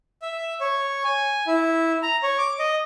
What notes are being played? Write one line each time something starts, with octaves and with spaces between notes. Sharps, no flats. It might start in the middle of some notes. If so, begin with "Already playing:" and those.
E5
C#5
G#5
E4
A#5
C#5
D6
D#5